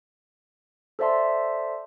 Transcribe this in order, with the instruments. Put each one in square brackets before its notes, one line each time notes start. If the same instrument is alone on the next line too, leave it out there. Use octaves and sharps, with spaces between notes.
[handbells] A4 C5 D5 E5 A5 C6